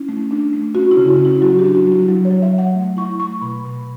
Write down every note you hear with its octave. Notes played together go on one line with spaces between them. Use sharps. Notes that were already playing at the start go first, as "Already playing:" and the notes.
Already playing: C#4 E4
A3
D4
A3
C#4 F#4
E4
C#3
F#4
C#4
E4
F#3 F#4
G4
D4
F#4
F#3
E4
F#3
C#5
F#3
E5
F#3
F#5
A3
E4 C#6
A3 C#6
B2 B5
B2